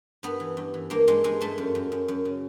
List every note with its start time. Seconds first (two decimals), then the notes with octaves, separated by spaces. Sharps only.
0.23 G2 B3
0.40 E3
0.57 G2
0.74 E3
0.90 G2 A#3
1.07 G2 G#3
1.24 G2 G#3
1.40 G2 A3
1.58 F#2
1.75 F#2
1.92 F#2
2.08 F#2
2.25 C#3